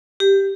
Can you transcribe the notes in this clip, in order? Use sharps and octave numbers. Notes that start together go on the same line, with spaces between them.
G4